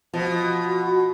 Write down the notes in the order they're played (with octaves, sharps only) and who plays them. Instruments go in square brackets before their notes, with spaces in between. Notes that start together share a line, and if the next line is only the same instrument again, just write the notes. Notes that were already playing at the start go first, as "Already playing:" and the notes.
[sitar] B2 [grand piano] F3 [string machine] F#4